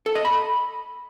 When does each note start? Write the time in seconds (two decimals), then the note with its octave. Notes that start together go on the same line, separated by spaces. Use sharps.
0.06 A4
0.15 D#5
0.25 B5